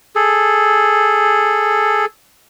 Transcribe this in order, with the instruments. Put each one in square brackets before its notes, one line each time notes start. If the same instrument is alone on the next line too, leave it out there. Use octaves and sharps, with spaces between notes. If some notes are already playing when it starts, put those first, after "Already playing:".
[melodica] G#4 A4